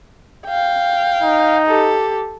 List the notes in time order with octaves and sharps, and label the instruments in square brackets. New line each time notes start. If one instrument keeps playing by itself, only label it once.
[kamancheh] F5 G5
[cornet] D#4
[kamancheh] G4 A4